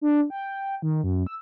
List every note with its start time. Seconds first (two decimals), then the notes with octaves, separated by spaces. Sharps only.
0.01 D4
0.30 G5
0.82 D#3
1.04 F#2
1.26 E6